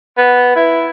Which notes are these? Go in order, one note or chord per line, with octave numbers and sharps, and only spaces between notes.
B3
E4